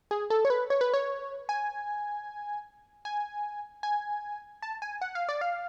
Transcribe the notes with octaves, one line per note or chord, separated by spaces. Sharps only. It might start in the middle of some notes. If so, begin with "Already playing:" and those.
G#4
A4
C#5
B4
C#5
B4
C#5
G#5
G#5
G#5
A5
G#5
F#5
F5
D5
F5